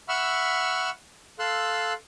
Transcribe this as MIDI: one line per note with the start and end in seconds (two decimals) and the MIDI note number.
0.09 0.90 76
0.09 0.90 78
0.09 0.90 83
0.09 0.90 85
0.09 0.90 88
0.09 0.90 89
1.39 1.93 69
1.39 1.93 77
1.39 1.93 84
1.39 1.93 88
1.39 1.93 90